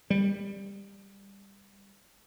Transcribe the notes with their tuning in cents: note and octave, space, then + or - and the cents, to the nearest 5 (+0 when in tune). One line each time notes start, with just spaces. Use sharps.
G3 +20